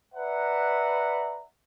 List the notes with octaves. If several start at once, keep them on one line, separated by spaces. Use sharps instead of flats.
B4 D5 E5 F#5 A#5